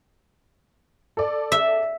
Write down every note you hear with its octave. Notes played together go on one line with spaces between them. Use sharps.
A4 D5
E5